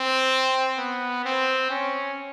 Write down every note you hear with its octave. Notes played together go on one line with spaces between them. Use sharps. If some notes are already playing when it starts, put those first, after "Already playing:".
Already playing: C4
B3
C4
C#4